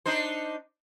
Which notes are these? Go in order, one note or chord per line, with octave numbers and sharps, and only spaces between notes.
D4 D#4 C5